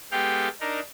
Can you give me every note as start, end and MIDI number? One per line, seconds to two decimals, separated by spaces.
0.12 0.48 56
0.12 0.48 59
0.12 0.48 67
0.12 0.48 69
0.12 0.48 77
0.12 0.48 79
0.60 0.80 62
0.60 0.80 63
0.60 0.80 70